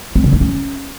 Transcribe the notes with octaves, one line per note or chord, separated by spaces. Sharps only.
C4
C#3
D4
C#4